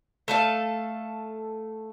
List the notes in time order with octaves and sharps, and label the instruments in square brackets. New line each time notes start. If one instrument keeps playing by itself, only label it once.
[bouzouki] A3 A4 F5